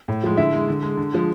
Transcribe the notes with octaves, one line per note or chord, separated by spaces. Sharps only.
A2
F3 G#3
D3 E4 E5
G#3
D3
G#3
D3
F3 G#3